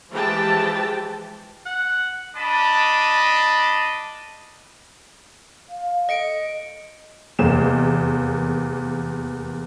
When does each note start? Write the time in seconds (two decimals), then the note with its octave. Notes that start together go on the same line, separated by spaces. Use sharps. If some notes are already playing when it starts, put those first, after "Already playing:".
0.11 E3 F3 G#3 G4 G5 A5
1.66 F#5
2.37 D4 D#5 A5 B5
5.69 F5
6.09 A4 D#5 C#7 D7
7.39 F1 E2 A#3 E7